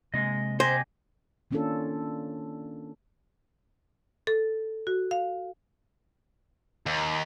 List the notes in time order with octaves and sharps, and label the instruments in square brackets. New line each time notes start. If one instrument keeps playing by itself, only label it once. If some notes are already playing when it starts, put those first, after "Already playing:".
[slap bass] C3 A#3 [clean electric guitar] G#3 D#5
[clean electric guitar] G4 D#5 G#5 [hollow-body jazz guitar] C5
[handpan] D#3 A#3 C#4 D4 F4 A4
[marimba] A4
F#4
F5
[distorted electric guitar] D#2